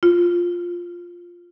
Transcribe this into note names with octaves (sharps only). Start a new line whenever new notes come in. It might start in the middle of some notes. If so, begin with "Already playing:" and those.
F4